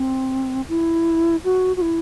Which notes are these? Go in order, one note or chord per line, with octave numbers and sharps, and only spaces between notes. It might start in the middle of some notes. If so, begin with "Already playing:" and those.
Already playing: C4
E4
F#4
F#4
E4